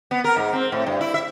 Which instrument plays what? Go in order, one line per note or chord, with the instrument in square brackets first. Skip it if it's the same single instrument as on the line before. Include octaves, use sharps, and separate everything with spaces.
[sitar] B3
A#4
G#2
C4
A2
G2
E4
E5